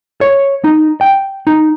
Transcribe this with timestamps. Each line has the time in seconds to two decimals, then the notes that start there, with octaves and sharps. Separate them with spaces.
0.21 C#5
0.64 D#4
1.01 G5
1.47 D#4